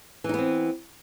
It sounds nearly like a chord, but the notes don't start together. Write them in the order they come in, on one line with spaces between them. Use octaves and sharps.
E3 D#4 B3 C4